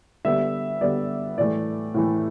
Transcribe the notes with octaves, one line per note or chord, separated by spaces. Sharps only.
D3 G3 B3 E5
D3 G3 B3 D5
A2 E3 A3 D5
A2 E3 A3